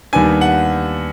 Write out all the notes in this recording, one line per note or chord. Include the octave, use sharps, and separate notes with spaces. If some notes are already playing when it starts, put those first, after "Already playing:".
D#2 D#3 G3 B3 D4 G#5
F#5